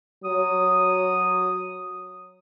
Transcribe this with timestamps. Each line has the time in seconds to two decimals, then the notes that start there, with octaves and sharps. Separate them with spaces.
0.24 F#3 D#6